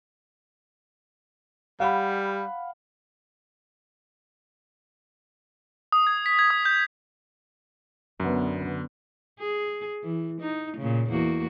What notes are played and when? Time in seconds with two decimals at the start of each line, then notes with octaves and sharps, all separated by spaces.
1.80 G3 F5 F#5 B5
5.92 D#6
6.07 G#6
6.26 B6
6.39 G#6
6.50 D#6
6.65 G6
8.20 F#2 D3 B3
9.40 G#4
10.03 E3
10.41 D#4
10.77 A#2 C#3
11.10 E2 A#3 F#4